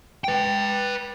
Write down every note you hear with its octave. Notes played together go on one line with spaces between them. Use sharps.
B4 G5